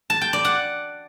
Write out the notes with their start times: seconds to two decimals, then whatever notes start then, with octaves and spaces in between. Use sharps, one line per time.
0.10 A5
0.21 G5
0.33 D5
0.45 F#5